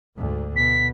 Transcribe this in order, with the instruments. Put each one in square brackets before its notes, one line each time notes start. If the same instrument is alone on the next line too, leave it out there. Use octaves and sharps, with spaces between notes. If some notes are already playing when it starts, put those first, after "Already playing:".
[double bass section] D2 G#2
[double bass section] B2 [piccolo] B6